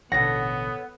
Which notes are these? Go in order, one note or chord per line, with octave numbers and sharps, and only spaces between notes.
A1 B2 D3 B3 A4 C#5 F#5 A#6